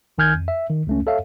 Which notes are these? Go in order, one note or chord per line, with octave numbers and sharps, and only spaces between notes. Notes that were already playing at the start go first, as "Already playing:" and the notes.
B1 D#3 G#5 F6 G6 G#6
F2
E5
D#3
C#2 A3 C#4
A4 C#5 E5 F5